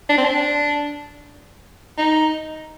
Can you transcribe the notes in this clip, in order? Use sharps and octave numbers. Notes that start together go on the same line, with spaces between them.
D4
C4
D4
D#4